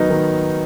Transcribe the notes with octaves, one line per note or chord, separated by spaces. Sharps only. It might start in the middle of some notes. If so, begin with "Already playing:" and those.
Already playing: D#3 F#3 B3 D#4 A#4
D#3